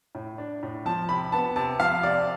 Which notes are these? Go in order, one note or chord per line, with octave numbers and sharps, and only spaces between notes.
A2
D4
A2
F3 A5
C3 B5
B3 A5
C3 A5
F3 F5
C3 D5